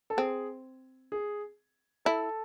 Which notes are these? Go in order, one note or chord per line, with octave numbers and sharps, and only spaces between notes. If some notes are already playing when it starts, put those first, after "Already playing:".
A4
C4 G#4
G#4
E4 A4